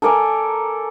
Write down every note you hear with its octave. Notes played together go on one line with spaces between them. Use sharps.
A4 A#4 D5 G#5